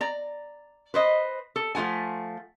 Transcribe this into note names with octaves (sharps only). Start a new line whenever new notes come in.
D5 A#5
B4 C5 D#5
A4
F3 A3 F4 F#5 G#5